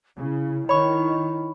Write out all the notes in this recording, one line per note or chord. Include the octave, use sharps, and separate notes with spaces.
C#3 E4
D#3 C#5 B5 C#6